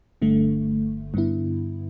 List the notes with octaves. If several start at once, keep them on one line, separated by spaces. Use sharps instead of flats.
G1 G2 D3 A3
G2 D3 B3 E4